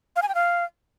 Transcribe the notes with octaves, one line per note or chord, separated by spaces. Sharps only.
F5
G#5
G5
F5